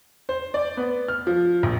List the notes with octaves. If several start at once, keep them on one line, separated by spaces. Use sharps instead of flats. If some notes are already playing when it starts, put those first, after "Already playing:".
C5
D5
B3
F6
F3
A#1